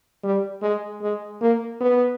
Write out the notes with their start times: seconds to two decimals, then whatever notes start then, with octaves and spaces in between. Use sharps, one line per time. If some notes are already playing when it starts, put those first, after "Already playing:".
0.24 G3
0.63 G#3
1.02 G#3
1.42 A#3
1.81 B3